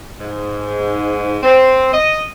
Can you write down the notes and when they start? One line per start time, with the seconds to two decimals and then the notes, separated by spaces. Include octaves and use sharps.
0.20 G#2
1.43 C4
1.93 D#5